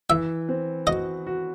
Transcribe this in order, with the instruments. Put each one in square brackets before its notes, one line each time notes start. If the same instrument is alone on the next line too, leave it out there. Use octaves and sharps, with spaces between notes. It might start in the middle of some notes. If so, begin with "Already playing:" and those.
[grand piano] E3 [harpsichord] E5
[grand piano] C4
[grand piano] F#4 [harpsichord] D#5
[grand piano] F#4